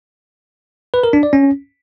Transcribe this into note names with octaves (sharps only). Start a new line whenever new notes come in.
B4
A#4
D4
D5
C#4